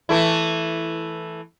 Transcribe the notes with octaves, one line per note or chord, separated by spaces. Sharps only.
E3 A3 E4